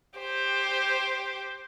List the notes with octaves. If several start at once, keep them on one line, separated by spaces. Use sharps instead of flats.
G4 C5